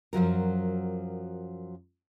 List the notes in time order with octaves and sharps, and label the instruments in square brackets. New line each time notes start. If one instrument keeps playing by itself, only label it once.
[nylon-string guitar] F#2 F3 F#3 A#4